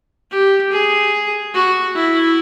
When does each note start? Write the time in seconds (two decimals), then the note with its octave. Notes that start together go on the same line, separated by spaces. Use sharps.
0.31 G4
0.71 G#4
1.54 F#4
1.95 E4